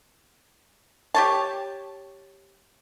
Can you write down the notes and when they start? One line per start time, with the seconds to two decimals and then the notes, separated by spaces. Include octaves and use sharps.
1.14 G4 C#5 A5